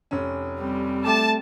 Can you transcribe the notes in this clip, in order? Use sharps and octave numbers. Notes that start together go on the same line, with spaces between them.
F1 C#4
G3 C4
A3 A5 D6